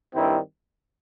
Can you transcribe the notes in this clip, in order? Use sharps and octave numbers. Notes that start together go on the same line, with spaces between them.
G2 D#3 G3 C4 E4